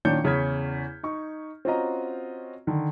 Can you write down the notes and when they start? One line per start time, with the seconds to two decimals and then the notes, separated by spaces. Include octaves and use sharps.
0.05 A#2 D#3 C#4 D4 G6 C#7
0.24 E2 C#3 C#4 F6 G#6 B6
1.03 D#4 C#6
1.65 C4 C#4 F4 F#4 D#5 A#5
2.67 D3 D#3